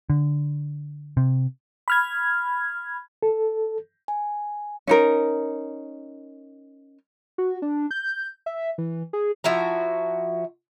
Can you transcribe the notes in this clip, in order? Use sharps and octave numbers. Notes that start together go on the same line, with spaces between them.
D3
C3
B5 F6 G#6
A4
G#5
C#4 D#4 A#4
F#4
D4
G6
E5
E3
G#4
F3 E4 F#4 A#5